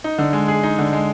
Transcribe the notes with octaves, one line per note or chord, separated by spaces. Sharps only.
D#4
D3
G#3
G#4
D#4
D3
G#3